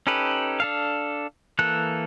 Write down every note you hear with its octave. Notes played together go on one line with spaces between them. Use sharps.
C#4 D#4 G4 A4 B4
D4 A4 F5
E3 A#3 A4 F#6